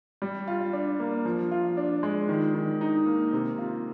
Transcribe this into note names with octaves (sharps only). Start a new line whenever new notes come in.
G3
F4
D4
A#3
F3
F4
D4
G#3
D#3
D#3
D#4
A#3
C3
F4